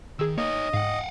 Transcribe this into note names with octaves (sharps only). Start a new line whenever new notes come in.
D#3 G#4 E6
A#3 D#4 C#5 D#5
G#2 F5 F#5